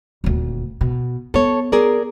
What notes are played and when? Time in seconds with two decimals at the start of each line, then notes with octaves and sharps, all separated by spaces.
0.24 D#1 D2
0.81 B2
1.34 B3 A4 C#5
1.72 G#4 A#4 D5